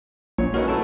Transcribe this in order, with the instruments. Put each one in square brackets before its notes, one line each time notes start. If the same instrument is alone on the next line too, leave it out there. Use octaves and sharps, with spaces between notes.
[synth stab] A#1 [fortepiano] A#2 C#5
[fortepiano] C#4 D#4 E4 [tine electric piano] F#4 A#4 B4
[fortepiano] F#3 A3 E4 [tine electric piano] A5